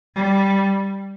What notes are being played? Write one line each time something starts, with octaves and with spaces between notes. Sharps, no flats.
G3